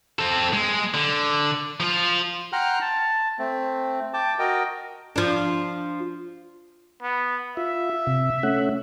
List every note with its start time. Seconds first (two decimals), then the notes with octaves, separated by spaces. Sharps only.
0.19 C4 A4
0.53 G#3
0.94 D3
1.80 F3 F4
2.53 F#5 G5 A#5 C6 F6 F#6
2.81 A5
3.39 A3 C4
4.14 G5 A5 D6
4.39 F#4 A#4 D#5 G5
5.16 F3 D4
7.02 B3
7.57 F4 E5
8.07 C3
8.43 A3 C#4 F#5